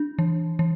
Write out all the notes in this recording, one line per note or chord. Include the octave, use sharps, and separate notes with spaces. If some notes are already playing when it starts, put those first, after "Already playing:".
Already playing: D4
E3
E3